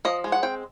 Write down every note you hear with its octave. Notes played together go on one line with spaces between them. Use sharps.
F3 D#5
G#3
F#5
C4 G5